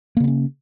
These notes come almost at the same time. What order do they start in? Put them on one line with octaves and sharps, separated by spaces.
A#3 C#3 B3 C#4